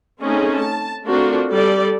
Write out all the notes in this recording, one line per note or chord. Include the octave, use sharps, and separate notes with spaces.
A3 C4 C#4 D#4 G#4
A5
A3 C4 D4 F4 F#4 A#4
G3 A4 D5